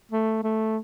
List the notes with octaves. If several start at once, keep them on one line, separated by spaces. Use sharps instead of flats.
A3
A3